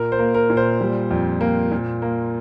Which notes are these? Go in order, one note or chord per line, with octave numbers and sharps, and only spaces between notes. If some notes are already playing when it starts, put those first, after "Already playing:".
Already playing: A#2 A#4
C5
A#3
A#4
A#2
C5
G3
F2
A#3
A#2
A#3